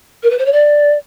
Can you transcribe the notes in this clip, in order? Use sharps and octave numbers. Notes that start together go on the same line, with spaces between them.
A#4
B4
C5
C#5
D5